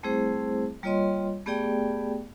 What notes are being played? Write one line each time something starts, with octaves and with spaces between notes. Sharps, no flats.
G3 A3 C4 E4 G#4 C5
G3 A#3 F4 C#5 D#5 C6
A3 B3 G4 G#4 D5 G5